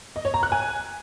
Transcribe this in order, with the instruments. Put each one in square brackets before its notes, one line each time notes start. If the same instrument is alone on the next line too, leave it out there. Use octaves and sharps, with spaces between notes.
[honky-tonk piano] D#5
C#5
A#5
F#6
G#5